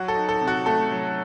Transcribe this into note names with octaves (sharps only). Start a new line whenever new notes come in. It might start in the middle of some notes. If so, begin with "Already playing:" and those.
Already playing: F#3 F#4
A4
D#4
A4
C3
F#4
A3 A4
F#3